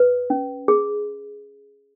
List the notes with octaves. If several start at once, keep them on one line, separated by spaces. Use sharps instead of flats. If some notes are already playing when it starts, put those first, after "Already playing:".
Already playing: B4
C#4
G#4